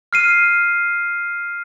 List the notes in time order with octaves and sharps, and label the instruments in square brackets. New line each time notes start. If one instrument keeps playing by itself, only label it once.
[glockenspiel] F6 C7 D#7